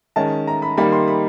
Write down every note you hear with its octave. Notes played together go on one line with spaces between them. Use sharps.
D#3 G#3 C#4 A5
A#5
B5
D#3 G3 A#3 D#4 B5
C6
B5